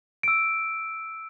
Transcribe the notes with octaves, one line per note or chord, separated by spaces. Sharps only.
E6 D7